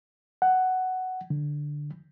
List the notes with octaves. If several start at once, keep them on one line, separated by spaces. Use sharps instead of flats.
F#5
D3